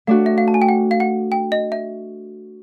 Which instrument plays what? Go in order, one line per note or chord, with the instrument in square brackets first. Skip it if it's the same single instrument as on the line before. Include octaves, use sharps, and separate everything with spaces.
[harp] A3 D4 F#4 [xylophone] F5
[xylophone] E5
F5
A5
G#5
G5
F#5
F5
F#5
G5
D#5
E5